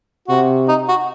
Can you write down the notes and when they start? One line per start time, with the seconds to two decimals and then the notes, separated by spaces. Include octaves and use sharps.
0.28 C3 F#4
0.69 D#4
0.89 F#4